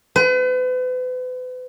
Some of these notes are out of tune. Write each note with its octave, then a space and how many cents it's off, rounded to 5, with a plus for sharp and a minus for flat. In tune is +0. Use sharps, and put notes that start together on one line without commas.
B4 +40